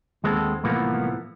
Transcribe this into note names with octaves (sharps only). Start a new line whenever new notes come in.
D#2 G#3 B3 C4 E4 A4
C2 A2 E3 F3 A#3 B3